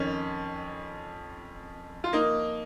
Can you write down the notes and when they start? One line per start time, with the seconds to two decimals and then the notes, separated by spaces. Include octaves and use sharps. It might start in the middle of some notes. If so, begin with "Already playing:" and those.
Already playing: F2 D#3 C#4
2.04 F4
2.13 A#3 D#4